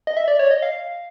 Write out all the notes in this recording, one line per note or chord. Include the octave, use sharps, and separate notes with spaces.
D#5
E5
D5
C#5
D#5
F5